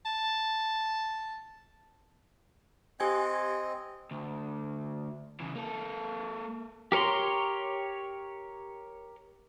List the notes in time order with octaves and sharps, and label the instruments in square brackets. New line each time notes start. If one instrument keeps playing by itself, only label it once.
[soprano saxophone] A5
[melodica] C4 D#5 [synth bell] G4 G#5 G#6
[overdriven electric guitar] D2
C#3 E3
A#3 A4
[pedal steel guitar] G4 A#4 C#5 A#5 C6